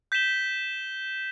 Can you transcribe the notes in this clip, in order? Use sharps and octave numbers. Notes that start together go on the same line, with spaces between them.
G6 B6 E7 G7